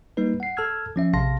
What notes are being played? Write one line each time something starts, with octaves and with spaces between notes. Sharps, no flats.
G3 A#3 D#4 B4
F#5 C7
A4 A5 E6 F6 G#6
F3 C#4 E5
A#1 C3 F5 A5 C6 A#6